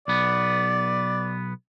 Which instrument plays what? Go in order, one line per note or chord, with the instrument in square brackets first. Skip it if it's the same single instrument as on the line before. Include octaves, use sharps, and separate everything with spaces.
[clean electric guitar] B1 B3 [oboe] D5